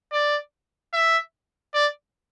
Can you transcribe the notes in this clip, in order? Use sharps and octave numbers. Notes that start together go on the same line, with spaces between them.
D5
E5
D5